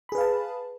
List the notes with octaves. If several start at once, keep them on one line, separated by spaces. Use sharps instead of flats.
G#4 B4 F5 A5 B5